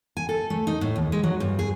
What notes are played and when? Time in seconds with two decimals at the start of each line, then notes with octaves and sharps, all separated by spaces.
0.17 G#5
0.29 A4
0.50 A3
0.67 D#4
0.81 A2
0.96 D#2
1.12 G#3
1.23 F#3
1.40 G2
1.59 G#4